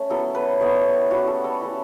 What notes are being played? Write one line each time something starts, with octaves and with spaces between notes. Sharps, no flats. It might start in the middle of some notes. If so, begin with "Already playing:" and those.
Already playing: A3 C#4
F#3 B3 E4 A4
B4
G3 B3 E4 C#5
G3 C#4 E4 F#4
A4
A4
A3 C#4 E4